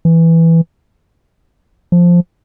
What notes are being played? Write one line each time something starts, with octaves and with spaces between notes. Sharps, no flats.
E3
F3